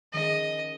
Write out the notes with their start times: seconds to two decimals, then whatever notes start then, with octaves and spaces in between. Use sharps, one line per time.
0.13 D#3 G#3 C#4 G#4 D#5